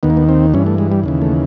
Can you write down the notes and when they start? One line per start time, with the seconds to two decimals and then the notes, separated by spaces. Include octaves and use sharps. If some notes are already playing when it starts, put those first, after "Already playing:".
0.03 D#2 D#3 B3
0.10 A#3
0.17 B3
0.29 C4
0.54 G2 E3 C#4
0.66 A3
0.78 G#3
0.92 G3
1.04 D#2 C#3 E3
1.22 A3